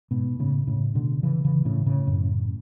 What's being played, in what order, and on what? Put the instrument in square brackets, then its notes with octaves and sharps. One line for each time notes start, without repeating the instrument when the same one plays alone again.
[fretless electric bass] G#2 B2
A2 C#3
A2 C#3
B2 D3
C#3 E3
C#3 E3
A2 C#3
A2 C#3
F#2 A2